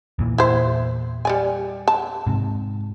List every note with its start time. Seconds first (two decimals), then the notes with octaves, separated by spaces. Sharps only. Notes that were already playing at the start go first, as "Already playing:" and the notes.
0.19 E2 A#2 E3
0.38 E4 C5
1.25 G3 D5 G#5
1.88 A5
2.27 G#2 C3